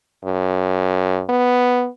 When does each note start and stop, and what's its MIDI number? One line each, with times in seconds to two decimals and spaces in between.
0.24 1.23 42
1.30 1.88 59